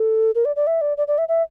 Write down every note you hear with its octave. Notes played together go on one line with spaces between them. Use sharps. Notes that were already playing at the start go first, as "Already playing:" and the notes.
Already playing: A4
A#4
D5
D5
E5
D5
D5
D5
E5
E5